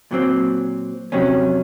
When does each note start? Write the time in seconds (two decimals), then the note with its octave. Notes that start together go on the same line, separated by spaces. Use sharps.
0.11 A#2 F#3 C4
1.12 F2 C3 F#3 C#4